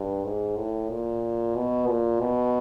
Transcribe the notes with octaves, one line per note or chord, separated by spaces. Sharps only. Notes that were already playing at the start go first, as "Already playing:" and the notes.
Already playing: G2
G#2
A2
A#2
B2
A#2
B2